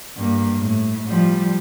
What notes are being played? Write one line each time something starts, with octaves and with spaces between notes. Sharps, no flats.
G2 A#3
A2
F3 G3